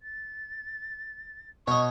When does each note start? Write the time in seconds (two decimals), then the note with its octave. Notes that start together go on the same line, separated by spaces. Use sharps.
0.01 A6
1.67 B2 C#5 D#5 C#6